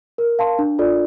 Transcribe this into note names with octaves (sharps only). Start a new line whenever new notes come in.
A#4
F5 A5 C6
D4
F4 A4 D5